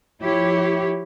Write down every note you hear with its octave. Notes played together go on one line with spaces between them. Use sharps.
F3 E4 G4 C#5